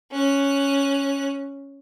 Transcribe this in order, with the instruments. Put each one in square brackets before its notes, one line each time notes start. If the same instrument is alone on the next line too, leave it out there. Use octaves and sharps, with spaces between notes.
[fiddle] C#4 F#6